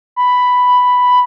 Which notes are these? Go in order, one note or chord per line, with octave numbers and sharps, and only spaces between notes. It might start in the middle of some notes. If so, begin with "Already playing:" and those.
B5